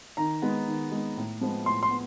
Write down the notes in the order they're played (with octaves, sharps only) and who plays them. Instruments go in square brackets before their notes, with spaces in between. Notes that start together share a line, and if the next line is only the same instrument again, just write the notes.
[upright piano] D#3 [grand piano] A#5
[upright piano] G#3 B3
D#3
G#3 B3
A2
F3 G#3 B3
[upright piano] A2 [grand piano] C6
[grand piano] C6
[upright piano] B3